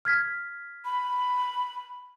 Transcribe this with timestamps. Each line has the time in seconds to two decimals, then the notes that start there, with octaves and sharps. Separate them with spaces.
0.05 F6 G#6 B6
0.85 B5